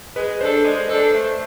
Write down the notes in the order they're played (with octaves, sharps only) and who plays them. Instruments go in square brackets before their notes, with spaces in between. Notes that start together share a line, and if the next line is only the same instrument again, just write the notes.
[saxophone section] G#3 [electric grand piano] B4
[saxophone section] D4 A4 [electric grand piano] C5
[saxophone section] G#3 [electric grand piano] D5
[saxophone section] D4 A4 [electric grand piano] C5
[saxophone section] A3